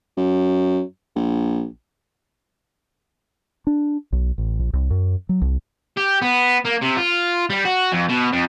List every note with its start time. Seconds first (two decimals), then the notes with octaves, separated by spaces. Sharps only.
0.17 F#2
1.16 A#1
3.67 D4
4.12 B1
4.38 A1
4.59 A#1
4.73 C2
4.90 F#2
5.29 F#3
5.42 C2
5.97 G4
6.22 B3
6.65 A#3
6.81 C3
6.96 F4
7.50 G3
7.65 F#4
7.92 F2
8.09 B2
8.33 F2